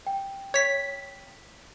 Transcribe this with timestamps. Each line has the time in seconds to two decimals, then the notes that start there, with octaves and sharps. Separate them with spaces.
0.07 G5
0.54 C#5 B6